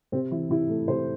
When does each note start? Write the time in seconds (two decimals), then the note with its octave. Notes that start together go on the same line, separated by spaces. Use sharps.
0.12 C3 C4
0.31 E3 E4
0.50 C3 E4
0.69 A3
0.88 C3 C5